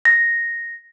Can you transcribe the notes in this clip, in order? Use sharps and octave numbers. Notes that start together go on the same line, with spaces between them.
A#6